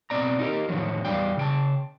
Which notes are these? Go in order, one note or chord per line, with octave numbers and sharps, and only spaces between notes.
B2 F3 C4 D5 A#5
D#4 G4 A#4
A2 D3 D#3 F3 F#3
E2 G3 D5 F5 G5
C#3 G5 A5